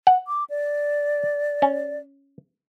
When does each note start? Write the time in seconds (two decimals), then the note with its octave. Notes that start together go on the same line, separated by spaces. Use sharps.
0.07 F#5
0.27 D6
0.50 D5
1.62 C#4